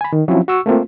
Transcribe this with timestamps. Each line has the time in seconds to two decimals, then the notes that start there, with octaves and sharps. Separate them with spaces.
0.01 G#5 B5
0.13 D#3
0.28 F3 F#3 C4 C#4 E4
0.48 F#4 C#6 E6
0.66 A3 A#3 C4 F4